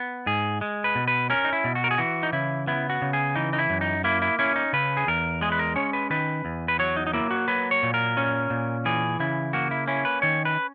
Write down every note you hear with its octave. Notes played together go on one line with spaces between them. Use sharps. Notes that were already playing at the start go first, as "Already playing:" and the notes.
Already playing: B3
G#2 G#4
G#3
B4
B2
B4
C#4 A#4
D#4
E4
B2
F#4
A#4
G#4
E3 F#4
D#4
C#3 E4
B3 E4
F#4
C#3
G#4
E3 D#4
D#4
E4
F#2
D#4
A#3 E4
E4
C#4 E4
D#4
C#3 B4
G#4
E2 A#4
G#3 G#4
B4
A#4
C#4 C#5
B4
D#3 B4
E2
B4
F#3 C#5
D#4
D#4
A#3 E4
F#4
F#3 B4
C#5
A#2
A#4
C#4
A#2
E3 G#4
C#3 E4
A#3 F#4
E4
C#4 E4
B4
D#3 C#5
B4